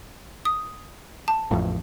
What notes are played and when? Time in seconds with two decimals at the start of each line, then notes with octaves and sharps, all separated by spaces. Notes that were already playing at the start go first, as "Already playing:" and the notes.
0.45 D#6
1.28 A5
1.51 A1 F2